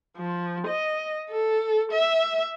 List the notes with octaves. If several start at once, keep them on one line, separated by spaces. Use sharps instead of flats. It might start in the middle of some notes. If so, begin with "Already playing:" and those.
F3
D#5
A4
E5